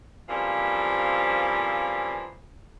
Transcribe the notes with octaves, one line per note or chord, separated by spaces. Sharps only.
C#3 E3 F3 G3 A#3 C4